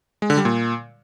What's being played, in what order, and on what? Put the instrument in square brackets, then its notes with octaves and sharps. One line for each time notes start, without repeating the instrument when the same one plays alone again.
[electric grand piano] G#3
D3
G3
A#2